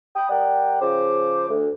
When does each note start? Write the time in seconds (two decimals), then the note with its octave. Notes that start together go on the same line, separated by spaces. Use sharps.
0.16 G5 B5 D#6
0.30 G3 A#4 D5 F#5 G5
0.82 C#3 F3 C5 D6
1.50 D2